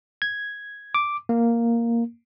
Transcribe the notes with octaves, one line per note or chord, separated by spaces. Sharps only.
G#6
D6
A#3